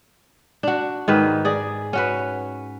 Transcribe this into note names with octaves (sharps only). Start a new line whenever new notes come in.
D4 F#4
G#2 D#3 B4
G#4 D5
C#4 F#4 B4